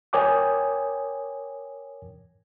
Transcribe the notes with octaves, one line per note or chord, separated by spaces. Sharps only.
A#4 C#5 G5 G#5 D6 D#6